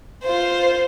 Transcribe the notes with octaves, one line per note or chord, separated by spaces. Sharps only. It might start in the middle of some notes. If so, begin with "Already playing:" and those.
F4 C5